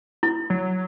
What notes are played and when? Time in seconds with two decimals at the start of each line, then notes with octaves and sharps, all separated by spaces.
0.23 E4
0.50 F#3